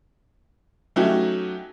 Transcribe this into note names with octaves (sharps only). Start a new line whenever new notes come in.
F#3 A3 C#4 D#4 F#4 G4